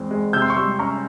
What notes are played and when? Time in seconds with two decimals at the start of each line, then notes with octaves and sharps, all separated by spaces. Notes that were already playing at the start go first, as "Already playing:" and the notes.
Already playing: E2 G#3 C4
0.11 G#3
0.33 C3 E6 G6
0.42 C6
0.50 C#6
0.56 G3 C6 E6
0.79 C#4 A#5 C#6